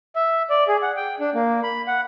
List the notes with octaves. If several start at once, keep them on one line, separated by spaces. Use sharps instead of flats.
E5
D5
G#4
F#5
G5
D4
A#3
B5
F#5